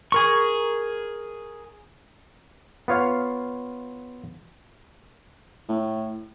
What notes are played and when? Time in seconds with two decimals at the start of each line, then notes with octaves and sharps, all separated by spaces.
0.12 G#4 A#4 C#6
2.88 B3 F4 C#5 F5
5.68 A2